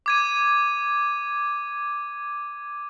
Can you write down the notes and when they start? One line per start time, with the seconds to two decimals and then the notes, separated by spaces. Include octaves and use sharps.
0.06 D6 G#6 D#7